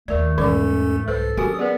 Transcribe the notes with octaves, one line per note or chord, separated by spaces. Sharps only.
D#2 D#3 A3 A#4 D5
B1 E2 G#2 E3 C#4 A4 D5 D6
C2 A4 B4 C5
F#3 C4 C#4 F#4 G4 A#4 G#5 D#6
B3 G#4 A#4 B4 D5